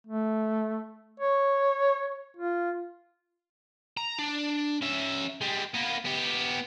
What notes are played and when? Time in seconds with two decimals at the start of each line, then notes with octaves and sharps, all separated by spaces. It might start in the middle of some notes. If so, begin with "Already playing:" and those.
0.07 A3
1.20 C#5
2.37 F4
3.97 A#5
4.18 D4
4.81 C#4 E5
5.41 G3 G#3
5.74 A#3 B3
6.05 B3 G4